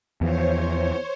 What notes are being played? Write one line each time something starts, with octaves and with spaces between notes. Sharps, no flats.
E2 E3 F3 C5 C#5